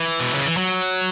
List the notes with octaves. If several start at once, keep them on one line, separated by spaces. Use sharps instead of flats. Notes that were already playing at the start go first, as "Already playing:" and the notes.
Already playing: E3
B2
C#3
E3
F#3